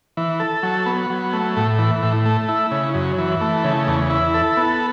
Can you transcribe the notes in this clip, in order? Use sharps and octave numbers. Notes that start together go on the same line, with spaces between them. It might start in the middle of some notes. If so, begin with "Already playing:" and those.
E3
A4
F#3
B3
F#3
A3
A2
E3
A2
A3
E4
C#3
F#2
E3
A3
C#3
E2
E4
A4
B3